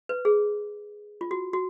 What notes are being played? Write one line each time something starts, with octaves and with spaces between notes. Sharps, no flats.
B4
G#4
F4
F#4
F#4